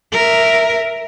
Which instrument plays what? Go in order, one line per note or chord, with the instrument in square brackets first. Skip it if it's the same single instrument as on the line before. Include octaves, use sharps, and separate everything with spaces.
[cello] A#4 E5